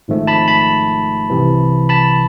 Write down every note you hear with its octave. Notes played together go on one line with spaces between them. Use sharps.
G#1 G#2 F3 A3
A5 B5
A5 B5
C2 C3 E3
A5 B5